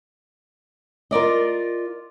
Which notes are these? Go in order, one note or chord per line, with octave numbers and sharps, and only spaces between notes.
F4 A#4 D5 D#5